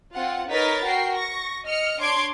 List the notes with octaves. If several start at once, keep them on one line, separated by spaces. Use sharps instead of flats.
C4 F4 F#5
D#4 A#4 B4 C#5 A6 B6
F#4 A#4 G5 C7
C#6 A#6
D#5 F6 C#7
D4 C#5 C6 D6 G#6 D7